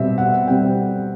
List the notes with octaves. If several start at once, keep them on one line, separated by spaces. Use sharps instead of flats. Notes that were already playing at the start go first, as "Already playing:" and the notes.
Already playing: B2 G3 C4 E5
F#5
B2 G3 C4 G5